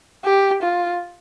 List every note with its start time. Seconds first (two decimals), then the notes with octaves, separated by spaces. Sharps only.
0.24 G4
0.63 F4